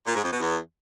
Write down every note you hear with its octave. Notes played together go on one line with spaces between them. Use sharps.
A#2
G#2
F2
B2
E2